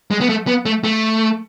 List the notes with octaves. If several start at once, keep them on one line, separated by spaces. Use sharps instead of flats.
G#3
B3
A3
B3
A3
A3